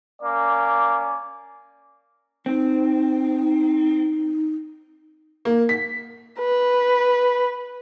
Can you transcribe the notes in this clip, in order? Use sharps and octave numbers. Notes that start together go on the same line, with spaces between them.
A#3 C#4 D5 D6
C4 D#4
A#3
B6
B4